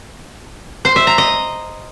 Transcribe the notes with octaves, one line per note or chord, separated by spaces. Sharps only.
C5
E5
A#5
D#5